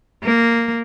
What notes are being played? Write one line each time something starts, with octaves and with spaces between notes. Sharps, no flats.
A#3